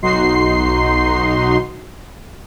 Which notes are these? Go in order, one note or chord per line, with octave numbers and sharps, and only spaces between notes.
B1 D#4 F#4 C6 C7